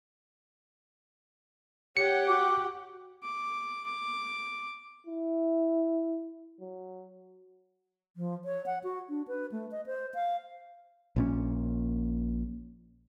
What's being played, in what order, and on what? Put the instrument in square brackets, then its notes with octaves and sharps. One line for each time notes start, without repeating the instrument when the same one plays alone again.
[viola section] G4 F#5 G5 [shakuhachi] C#5 [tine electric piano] C#7
[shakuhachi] F#4 [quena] D6
[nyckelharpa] D6
D6
[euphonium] E4
F#3
[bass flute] F3
C#5
F#5
F#4
D4
B4
A3
D#5
C5
F5
[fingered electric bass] A#1 A#2 C#4